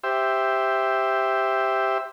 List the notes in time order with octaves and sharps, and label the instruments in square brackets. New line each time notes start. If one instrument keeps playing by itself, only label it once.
[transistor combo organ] G4 C5 E5